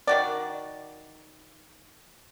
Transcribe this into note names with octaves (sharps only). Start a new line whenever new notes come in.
D#3 F#4 D5